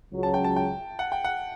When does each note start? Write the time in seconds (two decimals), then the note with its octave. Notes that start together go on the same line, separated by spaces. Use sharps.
0.12 C#2 C#3 F#3
0.23 A5
0.34 G5
0.44 A5
0.56 G5
0.99 F#5
1.12 G5
1.24 F#5